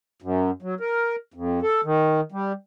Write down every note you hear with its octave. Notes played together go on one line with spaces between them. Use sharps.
F#2
F#3
A#4
F2
A4
D#3
G3